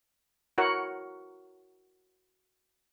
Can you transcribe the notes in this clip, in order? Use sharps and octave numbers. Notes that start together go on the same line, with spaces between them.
E4 F#4 A#4 C#5 F#5